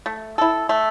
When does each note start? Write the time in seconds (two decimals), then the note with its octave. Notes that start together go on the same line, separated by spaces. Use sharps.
0.06 A3
0.38 E4 A4
0.69 A3